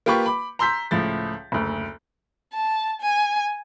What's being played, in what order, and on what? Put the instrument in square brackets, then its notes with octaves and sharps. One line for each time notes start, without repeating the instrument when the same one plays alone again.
[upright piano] A#3 F4 G4 B4 C#6
B5 D6
A#5 C6 E6 G6 B6
C#2 A2 F3 A6
F#1 D2
[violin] A5
G#5